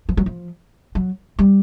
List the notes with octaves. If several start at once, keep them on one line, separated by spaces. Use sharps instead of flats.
F3
F#3
F3
F#3
G3